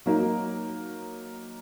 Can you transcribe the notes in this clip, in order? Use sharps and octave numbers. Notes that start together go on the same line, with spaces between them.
F#3 A#3 D#4